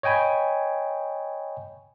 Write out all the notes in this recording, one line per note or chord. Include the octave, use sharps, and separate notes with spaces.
C#5 D#5 G5 G#5 B5